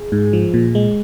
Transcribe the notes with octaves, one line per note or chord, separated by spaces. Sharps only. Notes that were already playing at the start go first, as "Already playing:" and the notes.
Already playing: G#4
G#2
F3
A#2
G#3